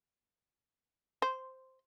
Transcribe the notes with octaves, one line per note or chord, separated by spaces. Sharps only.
C5